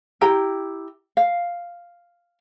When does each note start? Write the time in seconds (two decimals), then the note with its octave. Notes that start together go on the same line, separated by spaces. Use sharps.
0.21 E4 G4 G5 A#5
1.17 F5